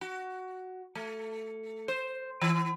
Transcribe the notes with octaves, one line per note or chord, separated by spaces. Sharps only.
F#4
A3
C5
E3